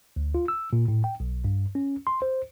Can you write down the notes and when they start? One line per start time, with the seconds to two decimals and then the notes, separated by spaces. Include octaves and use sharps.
0.16 D2
0.35 F4
0.48 E6
0.73 A#2
0.88 A2
1.04 G5
1.20 B1
1.45 G2
1.75 C#4
2.07 C6
2.22 C5